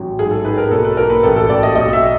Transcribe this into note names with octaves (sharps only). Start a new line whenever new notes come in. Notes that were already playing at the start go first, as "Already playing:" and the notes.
Already playing: A1 F#3
G#2 G#4
A4
D#4 B4
A#4
B1 A4
B4
A#3 A#4
B4
A1 A4
A4
A1 D5
D#5
B1 D#5
E5